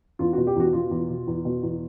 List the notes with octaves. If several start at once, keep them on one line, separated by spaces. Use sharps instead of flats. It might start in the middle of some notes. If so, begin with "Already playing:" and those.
E2 F4
B2 F#4
G4
E2 F#4
B2 F4
E2
B2
E2
B2
E2